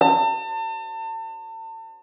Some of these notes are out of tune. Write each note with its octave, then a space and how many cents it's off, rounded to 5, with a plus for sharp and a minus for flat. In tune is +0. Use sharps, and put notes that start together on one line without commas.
A5 +35